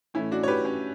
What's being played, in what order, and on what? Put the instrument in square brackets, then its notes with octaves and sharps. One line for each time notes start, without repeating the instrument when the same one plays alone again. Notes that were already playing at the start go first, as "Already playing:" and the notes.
[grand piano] A2 E3 A3 C#4 E4
D4 F#4
C#5
G4 B4
C#4